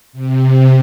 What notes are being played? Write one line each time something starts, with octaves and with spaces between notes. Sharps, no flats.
C3